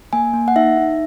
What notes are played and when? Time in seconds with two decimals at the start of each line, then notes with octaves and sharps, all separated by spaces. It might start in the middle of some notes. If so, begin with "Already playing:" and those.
0.13 A#3 G#5
0.33 A#3
0.48 F#5
0.56 D#4 E5
0.78 D#4